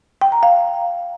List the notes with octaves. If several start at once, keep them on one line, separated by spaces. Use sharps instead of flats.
G5
A#5
F5